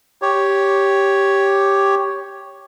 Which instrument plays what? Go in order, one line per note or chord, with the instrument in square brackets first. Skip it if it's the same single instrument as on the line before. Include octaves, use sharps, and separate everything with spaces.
[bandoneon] G4 C#5